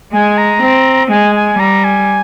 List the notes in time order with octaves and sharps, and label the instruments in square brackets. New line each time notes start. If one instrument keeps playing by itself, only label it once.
[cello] G#3 [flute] G#5
[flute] A#5
[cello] C4
[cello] G#3 [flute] G#5
[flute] G#5
[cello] G3 [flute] A#5
[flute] G#5